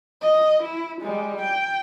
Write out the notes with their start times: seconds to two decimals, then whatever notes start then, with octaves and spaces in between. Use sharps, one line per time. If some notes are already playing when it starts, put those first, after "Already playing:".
0.21 D#5
0.63 E4
1.01 G3 G#3
1.41 G5